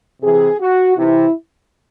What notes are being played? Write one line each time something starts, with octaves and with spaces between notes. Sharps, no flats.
C3 E3 G#4
F#4
C3 E3 E4